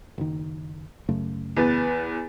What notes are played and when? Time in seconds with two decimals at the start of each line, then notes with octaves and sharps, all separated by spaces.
0.18 F#1 D#3
1.09 F#2 C#3 A3
1.57 E2 B4 A6